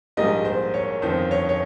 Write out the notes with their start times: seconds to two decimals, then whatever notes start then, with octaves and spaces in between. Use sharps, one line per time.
0.17 A#1 G#2 G3 A#3 D#5
0.45 C5
0.74 C#5
1.02 G1 F2 D#3 C5
1.31 C#5
1.49 C#5